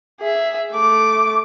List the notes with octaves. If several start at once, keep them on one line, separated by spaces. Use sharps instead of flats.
G#4 E5
A3 D6